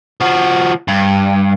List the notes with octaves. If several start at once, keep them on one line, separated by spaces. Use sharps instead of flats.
F3 F#4
G2